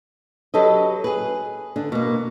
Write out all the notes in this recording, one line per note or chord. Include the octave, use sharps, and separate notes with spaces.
F#3 G4 A4 B4 D#5
G#4 B4
D3 D4
B2 A#3